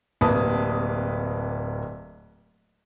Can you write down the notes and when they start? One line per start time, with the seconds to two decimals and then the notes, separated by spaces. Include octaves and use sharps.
0.21 D1 C3 A#3 B4 A5 D#6